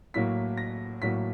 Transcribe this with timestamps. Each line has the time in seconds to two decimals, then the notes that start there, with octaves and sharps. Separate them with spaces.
0.14 A2 F#3 A#3 B6
0.58 A#6
1.02 A2 F#3 A#3 B6